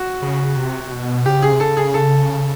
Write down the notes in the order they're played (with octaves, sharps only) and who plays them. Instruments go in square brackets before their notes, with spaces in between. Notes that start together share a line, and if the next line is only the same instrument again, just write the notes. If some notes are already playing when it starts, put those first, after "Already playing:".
Already playing: [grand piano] F#4
[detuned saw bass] C#3
C3
B2
[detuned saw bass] C#3 [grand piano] G4
[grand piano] G#4
[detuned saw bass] C3
[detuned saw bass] C#3 [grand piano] A4
[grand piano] G#4
A4